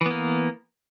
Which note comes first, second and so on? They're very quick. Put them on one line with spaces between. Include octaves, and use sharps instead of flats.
E3 B3 A#3